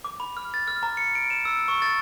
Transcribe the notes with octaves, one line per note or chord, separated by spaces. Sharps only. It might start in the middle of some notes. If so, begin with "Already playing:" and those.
D6
B5
F6
A6
F6
A#5
C#7
D7
E7
E6
C#6
A6